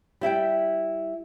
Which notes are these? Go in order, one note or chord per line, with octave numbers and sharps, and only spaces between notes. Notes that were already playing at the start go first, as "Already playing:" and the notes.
G3 E4 E5 G5